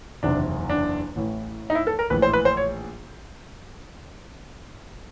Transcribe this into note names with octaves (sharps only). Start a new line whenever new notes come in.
F#1 E2 C3 D#3 D4
D4
A1 A2 E3
D#4
E4
A4
A#4
A#1 A2 E3 B4
C5
B4
C5
C#5